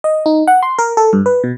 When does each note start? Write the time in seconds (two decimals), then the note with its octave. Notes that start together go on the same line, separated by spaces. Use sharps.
0.04 D#5
0.26 D#4
0.47 F#5
0.63 C6
0.79 A#4
0.97 A4
1.13 G2
1.26 B4
1.44 B2